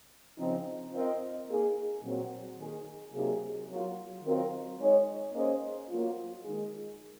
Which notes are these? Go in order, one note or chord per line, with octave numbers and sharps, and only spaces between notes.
C#3 F3 C4 D#4
C4 F4 A#4 D#5
A#3 D#4 G#4
A#2 F#3 C4
D#3 A#3 D#4 G#4
C3 F#3 A#3 D#4 G#4
F#3 A#3 F4
D#3 F#3 C4 F4 A#4
G#3 D#4 G#4 C#5
A#3 C#4 G#4 C5 D#5
F#3 A#3 F4
D#3 G#3 D#4 G#4